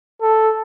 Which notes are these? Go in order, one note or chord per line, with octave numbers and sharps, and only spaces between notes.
A4